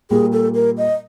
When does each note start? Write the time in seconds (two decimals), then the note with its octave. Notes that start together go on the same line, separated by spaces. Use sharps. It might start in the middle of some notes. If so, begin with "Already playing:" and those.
0.10 A#2 G3 A#3 G#4
0.32 A4
0.55 A#4
0.78 D#5